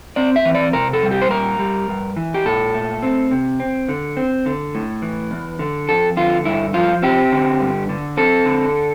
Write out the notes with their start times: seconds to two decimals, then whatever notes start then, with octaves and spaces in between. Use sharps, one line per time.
0.16 C4 D5
0.36 E5
0.45 E3
0.55 D5
0.73 C3 A#4
0.93 A4
1.03 G3
1.11 G4
1.22 C5
1.30 A#2 A#4
1.59 G3
1.88 G2
2.17 E3
2.34 G4
2.45 A#2 A4
2.74 A3
3.03 C4
3.31 C3
3.60 C4
3.89 D3
4.17 C4
4.46 D3
4.75 A2
5.02 E3
5.31 E2
5.59 D3
5.89 F2 A4
6.17 D3 F4
6.45 G2 E4
6.74 F3 F4
7.03 C4 G4
7.32 D3
7.60 G2
7.89 D3
8.17 C4 A4
8.46 D3